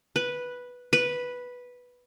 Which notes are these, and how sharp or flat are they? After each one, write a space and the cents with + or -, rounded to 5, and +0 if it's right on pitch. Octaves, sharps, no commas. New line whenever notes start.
B4 -5
B4 -5